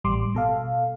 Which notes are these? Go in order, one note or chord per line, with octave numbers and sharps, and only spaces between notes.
A1 G3 C6 D6
B2 A4 F5